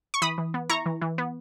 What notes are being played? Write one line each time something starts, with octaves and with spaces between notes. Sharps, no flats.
C#6
E3 B5 D#6
E3
B3
E4 A#5 C#6
E3
E3
B3